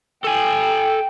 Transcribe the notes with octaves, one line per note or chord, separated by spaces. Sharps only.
A4 G5 G#5